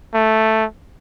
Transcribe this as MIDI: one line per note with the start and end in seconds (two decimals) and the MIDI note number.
0.14 0.65 57